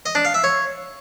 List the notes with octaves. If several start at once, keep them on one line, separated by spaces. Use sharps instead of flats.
D#5
D4
F5
E5
C#5